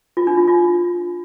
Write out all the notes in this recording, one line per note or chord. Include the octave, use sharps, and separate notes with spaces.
F4
D4
F4
F4